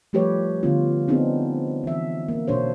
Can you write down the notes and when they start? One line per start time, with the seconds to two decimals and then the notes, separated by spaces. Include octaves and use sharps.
0.13 F3 G3 A3 G4 B4 C#5
0.63 D3 B3 F4
1.08 B3 C4 D4 D#4 G#4
1.84 E3 E5
2.28 A#3
2.48 B2 D4 C5 C#5